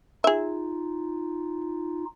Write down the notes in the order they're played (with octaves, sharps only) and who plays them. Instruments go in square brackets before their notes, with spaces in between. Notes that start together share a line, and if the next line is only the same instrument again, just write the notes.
[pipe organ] D#4 F4 [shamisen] G#4 E5